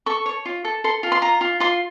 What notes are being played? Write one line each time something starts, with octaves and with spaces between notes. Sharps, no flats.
A4 C#6
C#5
F4
A4
A4 C6
F4
C6
F4 A#5
F4
F4 C6